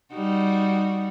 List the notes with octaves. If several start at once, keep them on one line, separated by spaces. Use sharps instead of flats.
G3 D#4 F#4